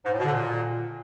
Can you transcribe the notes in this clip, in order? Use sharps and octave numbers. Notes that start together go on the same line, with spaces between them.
G#2
A2
B2
D3
A#2